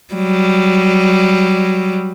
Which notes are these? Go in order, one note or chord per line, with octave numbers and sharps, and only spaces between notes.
F#3 G3